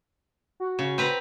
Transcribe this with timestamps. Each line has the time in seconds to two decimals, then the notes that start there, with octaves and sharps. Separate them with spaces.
0.60 F#4
0.79 C#3
0.98 C4 B4 A#5